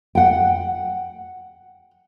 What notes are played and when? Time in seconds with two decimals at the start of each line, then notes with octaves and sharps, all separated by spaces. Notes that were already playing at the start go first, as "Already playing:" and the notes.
0.15 F#5 G5